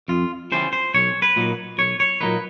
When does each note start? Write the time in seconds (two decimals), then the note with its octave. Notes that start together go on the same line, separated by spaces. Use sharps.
0.08 F2 F4
0.52 C#3 E3 G3 B3 C5
0.73 C5
0.94 B1 C#5
1.22 B4
1.36 A#2 F#3 A#3 D#4
1.78 B1 C#5
2.00 C#5
2.21 A#2 F#3 A#3 D#4 B4